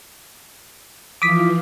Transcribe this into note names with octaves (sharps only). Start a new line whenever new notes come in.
E3 F3 F4 D6 D#6 B6